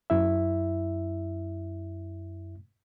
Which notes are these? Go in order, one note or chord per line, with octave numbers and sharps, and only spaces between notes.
F#2 E4 E5